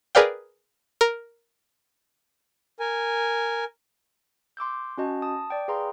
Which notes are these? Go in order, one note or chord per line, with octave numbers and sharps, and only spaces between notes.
G#4 A#4 B4 D5 F5 G5
A#4
A#4 G#5
C6 D6 E6 G6
C#4 F#4 D#5 A5
A5 D#6
D5 G5
G#4 B4 F5 G5 A#5 C6